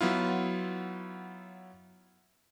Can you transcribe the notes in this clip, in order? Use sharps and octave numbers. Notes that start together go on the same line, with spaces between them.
F#3 B3 E4 F4